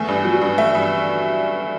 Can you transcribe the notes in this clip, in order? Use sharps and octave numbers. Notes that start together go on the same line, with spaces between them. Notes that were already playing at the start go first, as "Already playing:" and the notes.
Already playing: E2 A3
G2
F#3
G2
A3 E5
G2